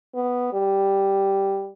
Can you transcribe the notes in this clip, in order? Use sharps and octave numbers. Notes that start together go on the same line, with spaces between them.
B3
G3